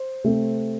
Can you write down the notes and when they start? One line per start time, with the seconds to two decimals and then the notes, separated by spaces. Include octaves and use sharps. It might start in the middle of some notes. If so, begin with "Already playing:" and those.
Already playing: C5
0.24 C3 A3 C4